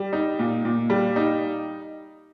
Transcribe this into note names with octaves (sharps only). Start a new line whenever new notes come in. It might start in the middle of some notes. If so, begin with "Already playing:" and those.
Already playing: G3
D#4
A#2
A#2
G3
D#4